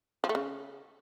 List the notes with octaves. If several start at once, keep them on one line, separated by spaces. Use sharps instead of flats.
F3
A3
C#3